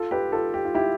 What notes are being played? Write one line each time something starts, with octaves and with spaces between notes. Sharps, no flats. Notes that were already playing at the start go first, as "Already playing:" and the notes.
Already playing: F4 A4
G4 B4
F4 A4
G4
F4
E4 G4